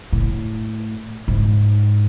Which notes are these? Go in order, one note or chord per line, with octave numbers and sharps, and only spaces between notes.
A2
G#2